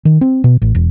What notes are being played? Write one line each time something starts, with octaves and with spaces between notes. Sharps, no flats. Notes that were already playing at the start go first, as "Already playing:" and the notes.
D#3
C4
B2
A1
E1